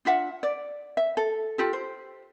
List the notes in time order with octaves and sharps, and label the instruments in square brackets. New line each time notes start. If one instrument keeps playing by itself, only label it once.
[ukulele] D4 F4 E5 F#5
D5
E5
A4
F4 G4 A4
C5